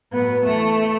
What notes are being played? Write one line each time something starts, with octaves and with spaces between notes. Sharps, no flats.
A2 F#3 B3
E2 E3 A3